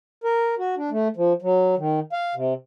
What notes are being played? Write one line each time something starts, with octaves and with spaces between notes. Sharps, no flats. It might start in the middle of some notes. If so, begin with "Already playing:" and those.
A#4
F#4
D4
A3
F3
F#3
D#3
F5
C3